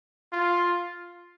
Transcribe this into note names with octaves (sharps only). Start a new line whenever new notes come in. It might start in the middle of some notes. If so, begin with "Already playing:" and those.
F4